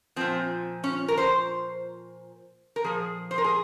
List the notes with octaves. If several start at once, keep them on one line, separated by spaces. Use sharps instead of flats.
A#2 F3 C4
C#4
A#4
C5
A#4
A#2 F3 G#4
C5
A#4
G#4